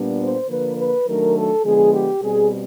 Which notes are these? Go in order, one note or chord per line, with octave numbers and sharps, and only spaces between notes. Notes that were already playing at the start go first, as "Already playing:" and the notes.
Already playing: A#2 G3 B3 D4
C5
D3 F3 A#3 B4
B4
D#3 F#3 A3 D4 A#4
A4
D3 F3 G#3 B3 G#4
G4
B2 G3 C4 G#4